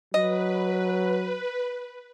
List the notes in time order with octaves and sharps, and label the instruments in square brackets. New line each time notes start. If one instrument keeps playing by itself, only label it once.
[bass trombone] F#3 [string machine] B4 [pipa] D#5